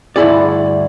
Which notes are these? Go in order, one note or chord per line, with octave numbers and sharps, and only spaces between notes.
D2 G2 E4 G#4 D5